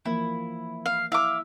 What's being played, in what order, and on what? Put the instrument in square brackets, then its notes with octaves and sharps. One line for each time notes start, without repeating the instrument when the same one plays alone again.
[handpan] E3 F3 A#3 [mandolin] E4
[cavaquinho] F5
[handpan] E4 [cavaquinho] E5 [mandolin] F5 D6